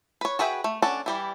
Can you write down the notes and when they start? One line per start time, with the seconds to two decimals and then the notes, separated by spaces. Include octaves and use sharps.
0.21 B4 C#5
0.39 F#4 G#4 B4 E5 G5
0.64 A3
0.82 C#4 D4 A4 F#5
1.06 E3 G3 E4